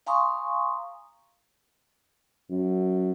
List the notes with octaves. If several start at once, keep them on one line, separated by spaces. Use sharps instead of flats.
F5 G#5 A#5 C6 C#6 D#6
F#2